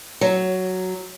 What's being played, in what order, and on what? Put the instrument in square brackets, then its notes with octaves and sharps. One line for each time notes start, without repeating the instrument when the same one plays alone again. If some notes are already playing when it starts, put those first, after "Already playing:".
[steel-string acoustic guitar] F#3